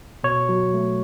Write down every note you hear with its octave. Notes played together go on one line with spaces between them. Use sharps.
B2 C#5
F#3
A3